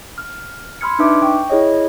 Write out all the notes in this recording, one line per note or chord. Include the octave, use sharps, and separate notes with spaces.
F6
B5 C6 E6 F6 G#6 C#7
D4 D#4 B4 E5 D6
G5 C#6
E4 G#4 C#5 D#5